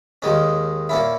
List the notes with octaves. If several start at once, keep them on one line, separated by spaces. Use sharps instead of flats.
D#2 D#3 G#3 C#4
A#2 A#3 C#4 E4